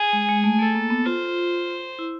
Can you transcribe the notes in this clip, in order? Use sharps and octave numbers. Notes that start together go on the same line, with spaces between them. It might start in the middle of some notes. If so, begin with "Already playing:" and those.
Already playing: G#4
G#3
G#3
A3
A3 A4
A#3
B3
F4 C5
E4